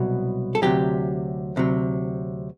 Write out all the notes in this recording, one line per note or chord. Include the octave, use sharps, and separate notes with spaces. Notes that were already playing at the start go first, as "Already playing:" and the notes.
Already playing: C2 B2 F#3
A4
D2 C3 F#3 G4
D2 C3 F#3